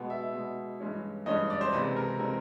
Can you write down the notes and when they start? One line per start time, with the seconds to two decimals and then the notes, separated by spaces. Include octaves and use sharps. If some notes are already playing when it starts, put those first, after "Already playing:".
Already playing: B2 G#3 B3
0.10 E5
0.33 B2 G#3 B3
0.80 G2 E3 G#3 C#4
1.26 G2 E3 G#3 C#4 D#5
1.50 D5
1.61 C5
1.72 C#2 C3 E3 G#3 C4 B4
1.96 A#4
2.20 C3 E3 G#3 C4 A#4